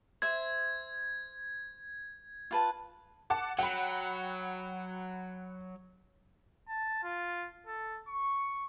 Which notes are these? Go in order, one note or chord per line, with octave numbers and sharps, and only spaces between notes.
C5 E5 G#6
F4 B4 A5
F#5 A5 D6
F#3 F#5 G5 B5
A5
F4
A4
C#6